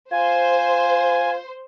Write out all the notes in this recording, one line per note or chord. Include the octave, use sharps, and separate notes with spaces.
F4 C5 G#5